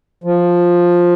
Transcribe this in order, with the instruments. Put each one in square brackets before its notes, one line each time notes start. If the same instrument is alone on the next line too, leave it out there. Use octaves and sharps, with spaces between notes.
[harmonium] F3